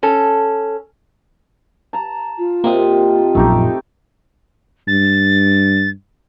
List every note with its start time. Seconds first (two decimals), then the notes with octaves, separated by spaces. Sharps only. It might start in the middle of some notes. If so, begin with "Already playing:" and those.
0.03 C#4 A4
1.93 A5 A#5
2.38 F4
2.64 C3 A#3 C4 D#5
3.35 A#1 F#2 A3 D#4 G4
4.88 G2 A6